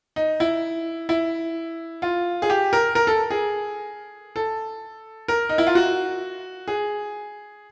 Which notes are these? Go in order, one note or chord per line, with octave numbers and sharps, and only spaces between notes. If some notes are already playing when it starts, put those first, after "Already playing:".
D#4
E4
E4
F4
G#4
G4
A#4
A#4
A4
G#4
A4
A#4
D#4
E4
F4
F#4
G#4